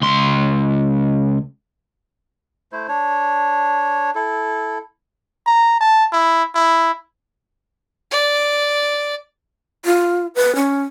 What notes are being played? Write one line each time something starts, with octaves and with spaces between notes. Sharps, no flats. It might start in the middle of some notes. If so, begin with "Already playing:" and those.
C#2 C6
A3 E4 C5
D4 C#5
E4 A4
A#5
A5
E4
E4
D5
F4
B4
C#4